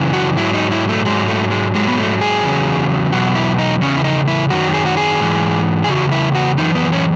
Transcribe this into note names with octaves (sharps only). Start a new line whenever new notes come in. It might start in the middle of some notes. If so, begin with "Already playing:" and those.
Already playing: F#2 C#3 E3
F#4
G#2 F#3 E4
D#4
E4
A3
G#2 F#3 G#3
A3
G#3
G#2 F#3 G#3
B3
A3
G#4
E2 C#3 F#3
E2 B2 F#3 F#4
E4
D#4
E2 C#3 C#4
E4
D#4
E4
F#2 D#3 F#3 F#4
G#4
F#4
G#4
G#2 E3
G#4
E2 C#3 F#4
E4
F#4
F#2 E3 D#4
B3
C#4